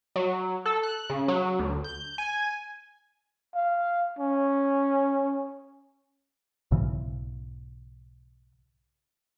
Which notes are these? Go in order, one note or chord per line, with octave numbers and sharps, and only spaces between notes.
F#3
A4
F#6
C#3
F#3
D2
G6
G#5
F5
C#4
B1 G#2 C#3 E3